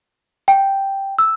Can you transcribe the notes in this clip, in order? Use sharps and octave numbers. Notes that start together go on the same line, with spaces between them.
G5
E6